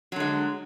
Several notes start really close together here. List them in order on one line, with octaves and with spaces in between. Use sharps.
F#3 D3 G#3